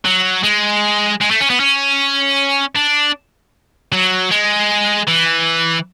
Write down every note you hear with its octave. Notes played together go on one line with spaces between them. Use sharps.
F#3
G#3
G#3
A3
C#4
B3
C#4
D4
F#3
G#3
E3